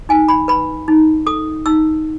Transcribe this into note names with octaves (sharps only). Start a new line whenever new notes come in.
D#4 G#5
B5
B4 B5
D#4
A4 D#6
D#4 E6